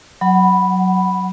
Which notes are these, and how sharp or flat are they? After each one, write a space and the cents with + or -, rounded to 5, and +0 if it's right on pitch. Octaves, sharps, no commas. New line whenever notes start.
F#3 +0 F#5 +25 B5 +0